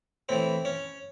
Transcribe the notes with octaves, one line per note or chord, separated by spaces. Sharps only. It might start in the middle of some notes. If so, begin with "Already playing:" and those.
A2 E3 C4
C#4